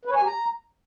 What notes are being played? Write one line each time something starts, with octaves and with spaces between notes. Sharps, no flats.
B4
C#5
G#5
G4
A#5